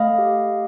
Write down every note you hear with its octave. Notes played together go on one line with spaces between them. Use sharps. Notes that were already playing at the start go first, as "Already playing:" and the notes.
Already playing: A3 D#5 F5
G4